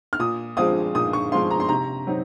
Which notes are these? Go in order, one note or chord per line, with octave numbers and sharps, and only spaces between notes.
F6
A#2 D#6
F3 G#3 C4 F4 D#6
A#2 D#6
C#6
F3 G#3 C4 F4 C6
A#5
C6
C3 A#5
F#3 C4 D#4